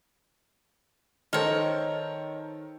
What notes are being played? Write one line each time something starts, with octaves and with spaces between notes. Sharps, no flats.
D#3 A4 A#4 C5 C#5 D#5